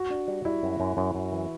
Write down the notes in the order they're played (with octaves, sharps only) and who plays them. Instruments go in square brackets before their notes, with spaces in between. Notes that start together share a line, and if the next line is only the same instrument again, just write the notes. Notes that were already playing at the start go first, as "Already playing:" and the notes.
Already playing: [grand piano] F#4
[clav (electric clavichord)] D4
G3
[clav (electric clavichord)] G3 [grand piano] E4
[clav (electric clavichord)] F#2
F#2
F#2
F#2
E3